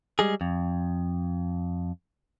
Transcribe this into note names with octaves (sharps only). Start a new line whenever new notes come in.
G3 G#3 G#4
F2